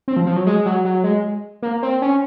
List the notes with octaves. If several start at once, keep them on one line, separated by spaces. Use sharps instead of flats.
C4
F3
F3
F#3
G#3
F#3
F#3
G#3
A#3
C4
C#4